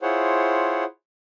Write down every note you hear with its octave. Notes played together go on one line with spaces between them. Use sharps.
E4 F4 G#4 C5 C#5 F#5